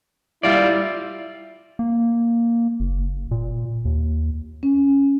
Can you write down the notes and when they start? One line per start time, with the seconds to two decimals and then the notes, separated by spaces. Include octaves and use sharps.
0.43 G3 E4 F4 D5
1.79 A#3
2.80 F#1
3.31 A#2
3.85 D#2
4.63 C#4